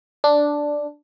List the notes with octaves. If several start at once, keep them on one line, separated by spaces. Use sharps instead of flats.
D4